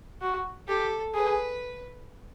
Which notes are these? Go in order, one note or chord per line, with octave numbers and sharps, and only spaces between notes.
F#4
G4 A4
G#4 B4